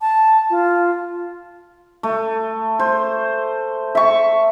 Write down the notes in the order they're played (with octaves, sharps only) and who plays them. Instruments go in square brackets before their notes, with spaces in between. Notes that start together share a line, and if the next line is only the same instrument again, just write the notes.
[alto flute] A5
F4
[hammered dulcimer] A3
C5
E5 C#6